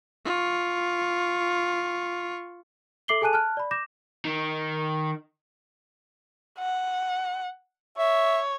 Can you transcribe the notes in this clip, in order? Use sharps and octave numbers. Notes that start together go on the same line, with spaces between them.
F4 C#6
A4 E5 D6 C7 F#7 G7
G#4 A4 G#5 A5 F#6 D#7
A5 F6 F#6
D5 B5
D6 G6 A#6 E7
D#3
F#5
C#5 E5